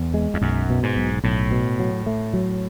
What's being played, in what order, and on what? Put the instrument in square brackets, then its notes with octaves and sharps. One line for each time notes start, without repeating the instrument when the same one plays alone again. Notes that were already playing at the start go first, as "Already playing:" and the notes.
Already playing: [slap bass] E2
[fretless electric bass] G#3
[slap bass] E2
[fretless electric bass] B1 [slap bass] F#2
[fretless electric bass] B2
[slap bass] G#2
[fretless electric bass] B1
[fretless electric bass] B1 [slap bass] A2
[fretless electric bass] B2
F#3
A3
F#3